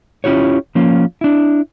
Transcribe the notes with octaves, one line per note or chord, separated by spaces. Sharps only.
C#4 E4 F4 G4 C#5
F3 A#3 C#4 F4
D4 E4